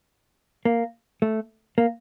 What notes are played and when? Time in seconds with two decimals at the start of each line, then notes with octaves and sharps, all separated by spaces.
0.65 A#3
1.22 A3
1.78 A#3